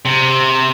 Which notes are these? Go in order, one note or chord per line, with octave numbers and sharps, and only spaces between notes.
C3